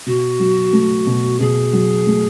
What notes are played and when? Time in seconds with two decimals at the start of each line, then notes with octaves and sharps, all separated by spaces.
0.06 B2 F#4
0.39 F#3
0.73 A3
1.06 B2
1.40 B2 G#4
1.73 F#3
2.07 A3